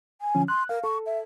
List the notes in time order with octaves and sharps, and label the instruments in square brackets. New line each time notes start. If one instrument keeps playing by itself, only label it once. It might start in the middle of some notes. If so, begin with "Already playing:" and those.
[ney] G#5
[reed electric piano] D3 F3 C#4
[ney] C6 [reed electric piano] F#6
[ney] A#4 [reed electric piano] F5
[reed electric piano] A4 [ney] C#6
[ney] E5